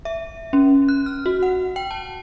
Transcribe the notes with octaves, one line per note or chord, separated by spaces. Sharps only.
E5
C#4
F#6
F6
F#4
F#5
G5
A5